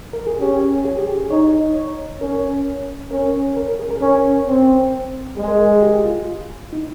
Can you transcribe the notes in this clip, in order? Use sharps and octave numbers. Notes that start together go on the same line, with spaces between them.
A#4
G#4
C#4 G4
G#4
G4
G#4
D#4 C#5
C#5
C#4 A#4
C#4 A#4
A#4
A#4
G#4
A#4
C#4 A#4
C4
G#3 G#4
A#4
G#4
G4
F4
D#4